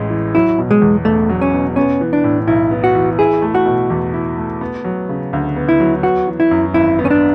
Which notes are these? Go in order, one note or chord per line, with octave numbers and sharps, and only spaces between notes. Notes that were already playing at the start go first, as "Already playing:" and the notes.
Already playing: A1 A2 E3 G#3
E3
F#3 E4
B2
G#3
E2
E1 A3
F#3
C#4
B2
B3 C#4
E3
D4
A2
B1 E4
B3
F#4
E3
E4 G#4
A3
F#4
B2
E2
E4
A3
B3
F#3
C#3
D2
B3
E4
F#3
B3 F#4
E3
E4
F#2
G#1 E4
B3
C#4
D4